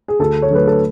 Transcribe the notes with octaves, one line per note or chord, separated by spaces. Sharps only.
G#4
D2 A4
C#5
D3 F#3 A3 B4
A4